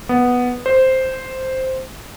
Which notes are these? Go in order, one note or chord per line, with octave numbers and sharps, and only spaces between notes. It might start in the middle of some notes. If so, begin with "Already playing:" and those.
B3
C5